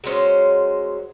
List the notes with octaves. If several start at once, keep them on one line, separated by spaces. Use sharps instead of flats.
F#3 G#3 C#4 C5